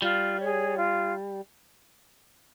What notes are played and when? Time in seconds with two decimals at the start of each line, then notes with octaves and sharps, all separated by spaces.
0.02 G3 F4
0.39 G#4 C#5
0.77 F4